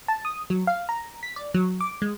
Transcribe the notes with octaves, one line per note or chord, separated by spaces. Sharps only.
A5
D#6
F#3
F5
A#5
B6
D5
F#3
D6
G#3